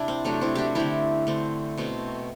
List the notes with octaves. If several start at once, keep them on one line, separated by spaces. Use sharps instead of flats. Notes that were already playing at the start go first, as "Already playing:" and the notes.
Already playing: C3 D4 E4
C4
C3 F#3 A3 D4
C4 E4
D4 F#4 G4
D3 A3 C4 E4 G4
D3 A3 C4
B2 A3 C4